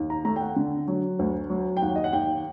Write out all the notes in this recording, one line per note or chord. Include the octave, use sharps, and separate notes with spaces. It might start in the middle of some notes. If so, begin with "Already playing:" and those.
Already playing: D#2
A#5
A3 A#5
G5
F#5
D3
F#3
D2
F#3
G5
D#2 F#5
D#5
F#5
D#2 G5